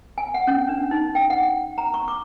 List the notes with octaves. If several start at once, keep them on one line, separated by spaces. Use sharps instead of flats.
G#5
F#5
C#4
D4
D#4
G5
F#5
A#5
C#6
D6